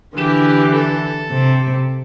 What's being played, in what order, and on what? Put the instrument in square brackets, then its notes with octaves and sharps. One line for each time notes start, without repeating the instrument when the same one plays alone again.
[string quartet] D3 E3 [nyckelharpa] G4
[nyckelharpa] A4
[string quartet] C3